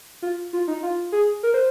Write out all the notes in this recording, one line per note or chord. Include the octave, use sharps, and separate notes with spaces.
F4
F4
D#4
F4
G#4
A#4
C5